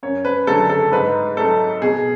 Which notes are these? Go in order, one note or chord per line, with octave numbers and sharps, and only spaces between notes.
F#2 C#5
B4
D3 F#3 A3 A4
A4
G#2 B4
F#3 A3 A4
B2 G#4